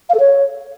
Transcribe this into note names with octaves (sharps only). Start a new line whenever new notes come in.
F5
A4
C#5